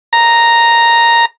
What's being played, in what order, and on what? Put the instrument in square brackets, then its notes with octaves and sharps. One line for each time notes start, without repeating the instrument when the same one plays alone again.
[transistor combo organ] A#5